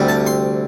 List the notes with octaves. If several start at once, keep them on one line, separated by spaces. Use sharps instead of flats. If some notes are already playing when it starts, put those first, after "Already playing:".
Already playing: D2 C3 G3
A5
C6